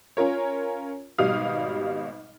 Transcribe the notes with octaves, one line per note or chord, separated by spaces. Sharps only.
C#4 F4 A#4 C#5
G#1 B2 G3 F5 D#6 F6